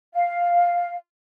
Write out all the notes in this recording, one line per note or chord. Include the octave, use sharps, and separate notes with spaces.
F5